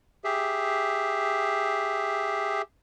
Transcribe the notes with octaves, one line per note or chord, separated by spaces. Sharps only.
G4 G#4 E5